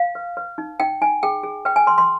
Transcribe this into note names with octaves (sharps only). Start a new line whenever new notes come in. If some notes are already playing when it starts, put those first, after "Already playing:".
Already playing: F5
B4
B4
D#4
D#4 G5
D#4 G#5
G#4 G5
G#4
B4 G5
G#5
B4 C6
C6